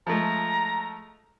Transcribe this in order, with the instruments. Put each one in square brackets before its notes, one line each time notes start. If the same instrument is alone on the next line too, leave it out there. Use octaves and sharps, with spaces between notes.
[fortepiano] F3 G#3 A3 [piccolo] A#5